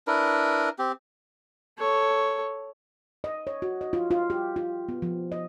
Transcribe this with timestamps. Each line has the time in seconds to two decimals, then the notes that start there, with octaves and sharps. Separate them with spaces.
0.07 D4 E4 A#4 B4
0.79 C4 G4
1.79 A4 C#5
3.24 D#5
3.47 C#5
3.62 F#4
3.81 D#5
3.93 F4
4.11 F4
4.30 G4
4.56 F4
4.89 B3
5.02 F3
5.32 D#5